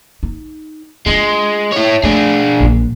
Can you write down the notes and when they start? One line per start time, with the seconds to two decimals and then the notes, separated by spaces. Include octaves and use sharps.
0.23 D#4
1.06 G#3 D4 F4
1.72 E4 C#5
2.03 A3 D4 G#4
2.60 A#1 F#3